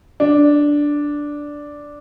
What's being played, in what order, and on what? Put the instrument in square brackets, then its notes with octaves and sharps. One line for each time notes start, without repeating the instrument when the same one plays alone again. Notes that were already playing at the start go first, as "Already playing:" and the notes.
[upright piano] D4